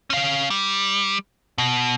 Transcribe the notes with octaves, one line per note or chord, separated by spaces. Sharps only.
C#4 F5
G3
B2